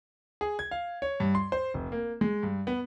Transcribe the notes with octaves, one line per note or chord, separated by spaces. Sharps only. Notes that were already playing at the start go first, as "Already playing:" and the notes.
G#4
G#6
F5
C#5
G2
C6
C5
F1
A#3
G#3
G2
B3